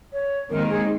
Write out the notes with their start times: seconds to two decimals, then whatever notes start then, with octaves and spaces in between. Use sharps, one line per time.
0.13 C#5
0.50 D#2 D#3 G#3 C4 D#4 A#4
0.69 G#4